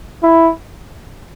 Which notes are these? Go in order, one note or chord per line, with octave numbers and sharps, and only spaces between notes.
E4